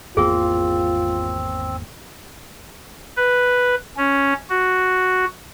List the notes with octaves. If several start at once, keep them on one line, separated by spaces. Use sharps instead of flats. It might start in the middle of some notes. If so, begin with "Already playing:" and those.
G#1 E2 A#3 C4 F4 G#4
B4
C#4
F#4